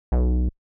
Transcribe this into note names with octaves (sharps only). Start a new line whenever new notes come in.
B1